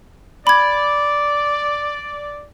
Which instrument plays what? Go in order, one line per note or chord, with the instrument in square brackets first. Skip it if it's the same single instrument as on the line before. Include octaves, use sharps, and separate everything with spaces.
[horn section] D5 [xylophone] B5 G#6